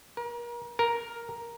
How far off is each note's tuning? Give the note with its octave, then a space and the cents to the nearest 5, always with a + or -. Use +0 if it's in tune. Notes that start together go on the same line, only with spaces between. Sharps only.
A#4 +35
A#4 +5